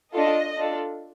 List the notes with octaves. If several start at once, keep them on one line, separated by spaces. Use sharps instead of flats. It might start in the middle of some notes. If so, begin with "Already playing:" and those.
D4 F4 A4 D#5
D4 F4 A4